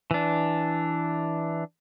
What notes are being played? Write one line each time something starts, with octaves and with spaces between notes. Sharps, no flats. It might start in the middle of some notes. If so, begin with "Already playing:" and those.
E3 D4